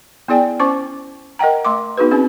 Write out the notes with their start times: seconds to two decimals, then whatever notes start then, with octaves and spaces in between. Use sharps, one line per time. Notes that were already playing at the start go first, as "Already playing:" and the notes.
0.28 B3 E4 G#4 D5 G5 G#5
0.60 C#4 C5 C#6 D6
1.39 A#4 D#5 F#5 G5 A#5
1.65 A3 C6 D6
1.97 B3 D#4 F#4 G#4 B4
2.11 C4 C#4 D#4 G#4